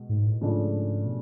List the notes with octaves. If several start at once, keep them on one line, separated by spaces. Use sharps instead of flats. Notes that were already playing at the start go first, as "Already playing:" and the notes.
Already playing: B2 G#3
G#2
A2
G#2 C#3 F3 A3 D4
B2